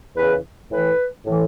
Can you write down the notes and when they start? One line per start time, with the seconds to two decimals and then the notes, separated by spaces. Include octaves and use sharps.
0.17 E2 C#3 E3 B4
0.71 A2 E3 B4
1.26 A2 E3